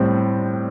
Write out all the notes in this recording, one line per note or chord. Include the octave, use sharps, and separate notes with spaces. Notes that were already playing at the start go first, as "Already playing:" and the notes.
Already playing: A2 G3 C4